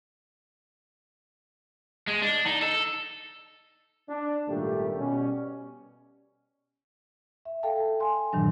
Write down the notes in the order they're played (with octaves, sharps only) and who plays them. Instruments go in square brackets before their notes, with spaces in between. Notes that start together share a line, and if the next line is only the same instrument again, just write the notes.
[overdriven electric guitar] G#3
D4
D#4
A4
[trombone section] D4
G#1 A#2 G3 A3 A#3 G4
B2 G3 C#4
[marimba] E5
A4 F5 G5 A5
G#5 C6
G2 A#2 D#3 E3 F#3 D4